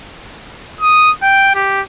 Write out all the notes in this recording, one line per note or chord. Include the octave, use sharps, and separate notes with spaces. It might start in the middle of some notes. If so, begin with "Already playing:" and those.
D#6
G5
G4